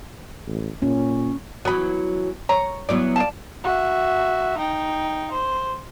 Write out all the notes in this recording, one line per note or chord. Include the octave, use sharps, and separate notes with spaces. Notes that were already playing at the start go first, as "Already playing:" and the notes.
A1
A#2 C#4
E3 F#3 B3 B5
C#5 A#5
E3 F#3 B3 D5
D5 F5 A5
F#4 E5
D#4 G5
C5